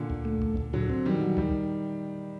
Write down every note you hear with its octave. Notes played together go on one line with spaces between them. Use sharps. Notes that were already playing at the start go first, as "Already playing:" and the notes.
Already playing: A#2 D3
D2
A3
D2
D2
A#2 D3 F#3
C4
D#3 F#3 G3
F#3
D2 D#3 G3